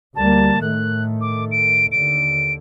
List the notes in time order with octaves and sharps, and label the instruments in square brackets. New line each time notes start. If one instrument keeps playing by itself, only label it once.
[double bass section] D2 G3 A#3 [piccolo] A5
[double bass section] A2 D#3 A3 [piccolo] F#6
[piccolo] D6
D7
[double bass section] D#2 D3 [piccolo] D7